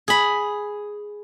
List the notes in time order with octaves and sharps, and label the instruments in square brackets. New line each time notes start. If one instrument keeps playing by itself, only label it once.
[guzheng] G#4 B5